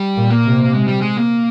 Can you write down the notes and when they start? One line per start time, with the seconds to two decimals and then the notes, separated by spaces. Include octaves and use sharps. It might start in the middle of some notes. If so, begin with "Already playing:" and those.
Already playing: G3
0.16 A#2
0.30 A#3
0.45 C3
0.73 G#3
0.88 G3
1.01 G#3
1.17 A#3